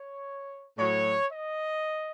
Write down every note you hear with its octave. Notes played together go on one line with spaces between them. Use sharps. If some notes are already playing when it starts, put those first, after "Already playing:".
Already playing: C#5
A2 F#3 C#5
D#5